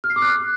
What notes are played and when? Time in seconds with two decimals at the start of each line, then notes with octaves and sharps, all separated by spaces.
0.04 F6
0.10 C7
0.16 D6
0.22 F#6